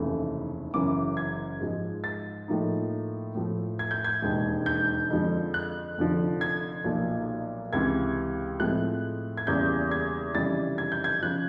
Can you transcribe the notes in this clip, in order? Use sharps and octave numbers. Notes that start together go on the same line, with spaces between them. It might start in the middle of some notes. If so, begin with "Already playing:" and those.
Already playing: F1 D#2 C#3 E3 A3
F#1 F#2 C#3 E3 D6
G#6
G#2 F3 G#3
A6
A2 F3 A#3 D#4
A2 F3 A3
G#6
G6
G#6
E1 D#2 D#3 G#3
G6
F2 D3 F3 G#3
F#6
F1 F2 D3 F3
G#6
B1 A#2 F3
C#2 C3 E3 G#6
A2 F3 G#3 C4 E4 F#6
G#6
E2 C#3 E3 G3 A#3 G6
G#6
F1 F2 C#3 E3 G3 A6
G#6
G6
G#6
C#3 F3 F#6